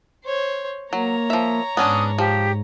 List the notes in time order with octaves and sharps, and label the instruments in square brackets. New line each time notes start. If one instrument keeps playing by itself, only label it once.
[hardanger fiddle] C5 C#5
[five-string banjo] F#3 [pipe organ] A#3 [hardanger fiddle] C#5 A#5
[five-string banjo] F3 E5
[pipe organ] G#2 [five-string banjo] B3 C#4 D4 [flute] D#6
[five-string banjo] F3 [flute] G4